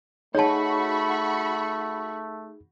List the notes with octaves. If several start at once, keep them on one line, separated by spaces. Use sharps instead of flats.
A3 D#4 F#4 G#4 C#5 A5 B5 C#6